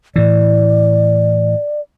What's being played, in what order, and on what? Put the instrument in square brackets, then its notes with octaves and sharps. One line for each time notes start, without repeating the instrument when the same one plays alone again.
[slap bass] A2 E3 [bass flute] D5